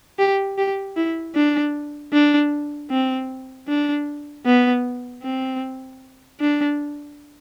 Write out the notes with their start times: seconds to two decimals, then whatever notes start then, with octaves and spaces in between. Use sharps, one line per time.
0.19 G4
0.58 G4
0.97 E4
1.35 D4
2.13 D4
2.90 C4
3.68 D4
4.46 B3
5.23 C4
6.40 D4